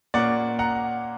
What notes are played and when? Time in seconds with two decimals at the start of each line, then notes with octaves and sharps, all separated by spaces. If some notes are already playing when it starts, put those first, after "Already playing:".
0.14 A#2 A#3 C#4 D5 F#5
0.59 F#5 A#5